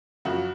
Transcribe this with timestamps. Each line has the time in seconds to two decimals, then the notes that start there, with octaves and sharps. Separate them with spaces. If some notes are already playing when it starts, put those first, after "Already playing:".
0.25 F#2 C#3 F3 F#4